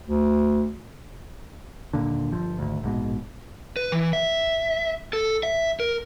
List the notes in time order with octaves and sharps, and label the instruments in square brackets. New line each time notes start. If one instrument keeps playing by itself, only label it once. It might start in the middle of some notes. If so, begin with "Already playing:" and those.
[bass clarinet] D2
[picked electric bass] D#1 A#1 A#2 D3
G1 F3
G#1 D2
A#1 G#2 B2
[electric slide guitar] B4
E3
E5
A4
E5
A#4